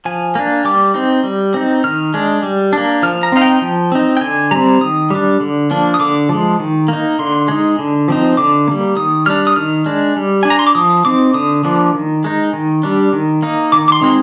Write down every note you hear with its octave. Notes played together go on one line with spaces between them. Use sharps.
F3 G#5
A#3 D4
G3 D6
C4 D#4
G3
C4 D#4
D#3 F6
G#3 D4
G3
A#3 D4
F3 F6
A#5
C4 D#4 F5
G5
F3
C4 D#4
G5
D3 G#5
G3 C4 A#5
D#3 D#6
G3 D4
D3
F3 A#3 D4
D#6
D3 D6
F3 G#3
D#3
A#3 D#4
D3 C6
G#3 D#4
D3
F3 C4 D#4
D3 D6
G3 A#3
D#3 D#6
G3 D4 F6
D#6
D#3 F6
G#3 D4
G3
D4 G#5
A#5
C6
D6
F3 D#6
C4 D#4 D6
D3 D#6
F3 A#3 D4
D#3
G#3 D#4
D#3
G3 D4
D#3
A#3 D#4
D#3 D6
D6
C6
G#3 C4 D#4